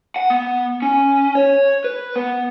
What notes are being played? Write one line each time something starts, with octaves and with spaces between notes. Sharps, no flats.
F#5
B3
C#4
C#5
B4
B3